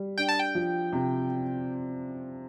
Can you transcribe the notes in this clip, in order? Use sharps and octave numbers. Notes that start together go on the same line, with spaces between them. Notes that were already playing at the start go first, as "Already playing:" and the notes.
Already playing: G3
D4 G5
A5
G5
F3
C3